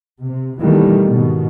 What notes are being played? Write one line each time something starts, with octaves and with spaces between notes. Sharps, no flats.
C3
B2 D#3 E3 G3 A3 A#3
G#2 B2 D#3